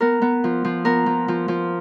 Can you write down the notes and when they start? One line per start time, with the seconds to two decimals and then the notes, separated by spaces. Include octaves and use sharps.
0.01 B3 A#4
0.22 B3
0.44 F3
0.65 F3
0.85 B3 A#4
1.06 F3
1.28 F3
1.48 F3